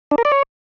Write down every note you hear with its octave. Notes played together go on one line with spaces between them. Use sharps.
D4
A#4
D5
C#5